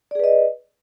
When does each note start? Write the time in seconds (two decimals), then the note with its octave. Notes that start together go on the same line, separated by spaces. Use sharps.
0.11 D5
0.15 G#4
0.19 B4
0.24 D#5